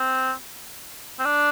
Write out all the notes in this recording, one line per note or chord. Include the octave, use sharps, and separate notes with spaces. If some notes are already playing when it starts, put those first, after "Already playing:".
Already playing: C4
C4
D4